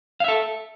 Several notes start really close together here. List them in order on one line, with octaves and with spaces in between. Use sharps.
F5 E5 A4